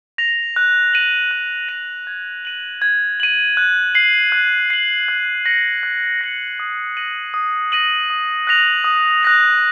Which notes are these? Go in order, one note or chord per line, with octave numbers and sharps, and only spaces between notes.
A#6 F7
F#6
A#6 D#7 F#7
F#6
A#6 D#7 F#7
G#6
D#7 F#7
G#6
D#7 F#7
F#6
C7 F#7
F#6
C7 F#7
F#6
A#6 C#7 F#7
F#6
A#6 C#7 F#7
D#6
A#6 D#7 F#7
D#6
A#6 D#7 F#7
D#6
F#6 A#6 F7
D#6
F#6 A#6 F7